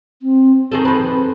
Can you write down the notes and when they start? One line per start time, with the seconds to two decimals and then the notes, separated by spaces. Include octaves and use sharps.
0.22 C4
0.72 D#3 C4 G#4 A4
0.85 F2 B4